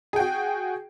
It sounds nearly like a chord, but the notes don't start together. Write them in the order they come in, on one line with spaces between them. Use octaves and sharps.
G#4 G5 F#4